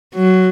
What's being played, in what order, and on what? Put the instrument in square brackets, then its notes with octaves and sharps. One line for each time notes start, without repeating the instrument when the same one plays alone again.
[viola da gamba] F#3